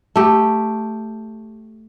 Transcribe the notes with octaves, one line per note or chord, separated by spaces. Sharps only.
A3 G4